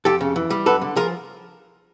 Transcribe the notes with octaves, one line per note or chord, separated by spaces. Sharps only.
F2 G4 A4
C#3
E3
G3
F#2 A4 B4
D3
F3 G#4 A#4